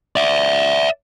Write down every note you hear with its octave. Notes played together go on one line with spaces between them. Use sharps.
D5 E5